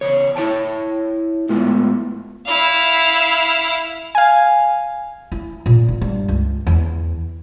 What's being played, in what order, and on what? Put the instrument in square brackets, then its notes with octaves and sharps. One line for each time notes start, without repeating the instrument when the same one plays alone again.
[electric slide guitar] E2 C#3 C#5
E4 C#5 G5 A5
A2 G#3 B3 F4 B4
[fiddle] E4 F5
[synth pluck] F5 G#5
[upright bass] E4
A#2
E4
G2
C#2
E2